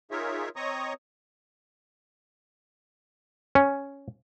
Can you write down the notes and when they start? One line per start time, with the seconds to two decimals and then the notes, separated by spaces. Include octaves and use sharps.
0.11 D#4 F4 G#4 A#4 C#5 E5
0.56 C4 C#5 D#5 A#5 C#6 D#6
3.55 C#4